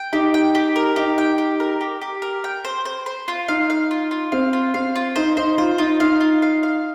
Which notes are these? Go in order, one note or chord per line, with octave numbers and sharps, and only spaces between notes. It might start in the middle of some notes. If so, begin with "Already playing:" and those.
Already playing: G5
D#4 G4
G5
G4
A#4
D#4 G4
G5
G4
A#4
G4
G4
A#4
G5
C5
C5
C5
F4
D#4 F5
F5
F4
F4
C4 F5
F4
C4 F5
F4
D#4 C5
D#4 C5
F4 C5
D#4 F4
D#4 F5
F4
F5
F5